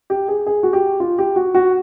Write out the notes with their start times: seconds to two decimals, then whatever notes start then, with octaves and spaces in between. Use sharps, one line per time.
0.10 G4
0.28 G#4
0.46 G#4
0.63 F#4
0.73 G4
1.00 F4
1.18 G4
1.36 F#4
1.55 F#4